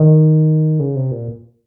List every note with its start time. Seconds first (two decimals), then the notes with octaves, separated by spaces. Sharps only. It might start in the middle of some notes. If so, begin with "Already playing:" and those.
Already playing: D#3
0.80 C#3
0.95 C3
1.11 A#2